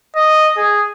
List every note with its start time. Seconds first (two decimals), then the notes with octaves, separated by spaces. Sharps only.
0.16 D#5
0.57 G#4